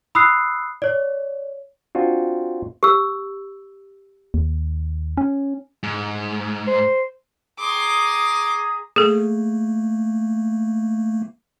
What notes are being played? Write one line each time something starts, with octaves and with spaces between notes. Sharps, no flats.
B5 D#6 E6 F#6 C7
C#5 D5
C4 D4 F4 F#4
G4 E6
D#2
C#4
G#2
C5
G#4 A#5 C6 D6 D#6
A3 A#3 G#4 A4